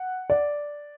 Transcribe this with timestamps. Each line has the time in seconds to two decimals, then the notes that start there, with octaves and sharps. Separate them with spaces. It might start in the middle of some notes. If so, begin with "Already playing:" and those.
Already playing: F#5
0.30 D5